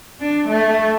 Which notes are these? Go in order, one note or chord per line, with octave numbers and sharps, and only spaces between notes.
D4
A3